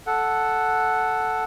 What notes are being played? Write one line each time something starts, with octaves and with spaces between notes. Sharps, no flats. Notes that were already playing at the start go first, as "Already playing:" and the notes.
A4 F#5